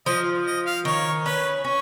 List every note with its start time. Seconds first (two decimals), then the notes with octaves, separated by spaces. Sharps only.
0.06 F3 D#5
0.47 D#5
0.66 F5
0.85 D#3 C#5
1.25 C#4 B4
1.64 C#4 C#5